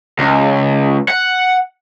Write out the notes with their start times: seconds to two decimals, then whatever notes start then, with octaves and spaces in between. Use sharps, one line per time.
0.19 C#2
1.09 F#5